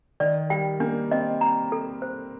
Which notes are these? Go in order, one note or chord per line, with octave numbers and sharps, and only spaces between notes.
D#3 D5
G3 G5
A#3 D4
C4 D#5
A#5
A4
C5